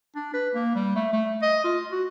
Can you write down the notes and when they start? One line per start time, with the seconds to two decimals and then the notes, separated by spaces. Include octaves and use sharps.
0.16 D4
0.33 B4
0.54 A#3
0.75 G3
0.95 A3
1.13 A3
1.42 D#5
1.64 F4
1.92 F#4